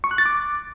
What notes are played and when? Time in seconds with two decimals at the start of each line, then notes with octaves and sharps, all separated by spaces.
0.04 C#6
0.11 F#6
0.18 A6
0.26 D6